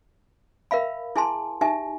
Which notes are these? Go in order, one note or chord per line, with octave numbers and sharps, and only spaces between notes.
A#4 E5 F5 B5
E4 G#4 G#5 A5 C6
D#4 G4 E5 G#5